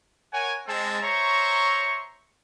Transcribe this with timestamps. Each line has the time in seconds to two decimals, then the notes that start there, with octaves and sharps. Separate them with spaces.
0.33 A#4 C#5 F#5 G#5
0.67 G#3 C4 A5
1.02 C5 C#5 E5 A#5 C6 C#6